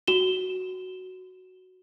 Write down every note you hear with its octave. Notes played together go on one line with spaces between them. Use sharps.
F#4 E7 G7